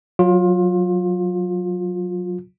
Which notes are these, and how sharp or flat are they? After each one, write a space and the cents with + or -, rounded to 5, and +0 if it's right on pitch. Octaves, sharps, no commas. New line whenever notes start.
F#3 -15 F4 +25